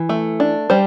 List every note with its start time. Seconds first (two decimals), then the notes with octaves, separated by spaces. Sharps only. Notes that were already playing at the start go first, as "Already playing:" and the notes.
Already playing: E3
0.09 A3
0.40 D4
0.70 G3 C5